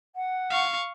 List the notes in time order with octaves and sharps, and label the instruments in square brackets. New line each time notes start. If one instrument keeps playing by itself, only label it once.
[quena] F#5
[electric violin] F5 C#6